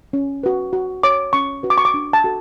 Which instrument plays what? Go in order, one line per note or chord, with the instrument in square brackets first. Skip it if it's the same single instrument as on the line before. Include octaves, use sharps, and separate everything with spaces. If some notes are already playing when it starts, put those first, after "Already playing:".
[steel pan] C#4
F#4 B4
F#4
C#5 D6
C#4 C#6
F#4 B4
D6
C#6
D6
D4
A5
F#4 A4